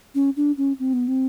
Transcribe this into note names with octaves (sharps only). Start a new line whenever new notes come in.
C#4
D4
C#4
C4
B3
C4